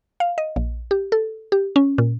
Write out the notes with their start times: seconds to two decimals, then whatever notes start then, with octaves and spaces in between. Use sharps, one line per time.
0.20 F5
0.38 D#5
0.56 A#1
0.91 G4
1.12 A4
1.52 G4
1.76 C#4
1.98 A#2